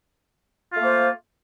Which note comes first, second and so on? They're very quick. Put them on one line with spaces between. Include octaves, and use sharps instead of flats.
F4 A3 A#3 C5